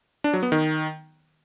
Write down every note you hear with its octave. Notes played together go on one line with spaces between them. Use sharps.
D4
F#3
B3
D#3